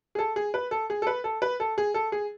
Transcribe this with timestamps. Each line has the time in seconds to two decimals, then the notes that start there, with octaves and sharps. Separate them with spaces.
0.15 G#4
0.19 A4
0.36 G#4
0.54 B4
0.71 A4
0.90 G#4
1.02 A4
1.07 B4
1.24 A4
1.42 B4
1.60 A4
1.78 G#4
1.94 A4
2.12 G#4